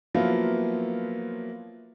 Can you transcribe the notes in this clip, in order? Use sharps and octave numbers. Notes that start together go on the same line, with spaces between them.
F3 F#3 A#3 B3 E4 F4